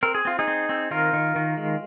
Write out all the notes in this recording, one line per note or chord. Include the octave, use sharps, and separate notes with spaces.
C4 A#4
G#4
C4 F4
D#4 G#4
C4
C4
D#3 F4 A#4
D#3
D#3
G#3